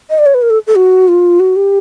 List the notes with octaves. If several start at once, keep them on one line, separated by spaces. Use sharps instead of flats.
D#5
D5
C#5
B4
A#4
A4
A4
F#4
F4
F#4
G4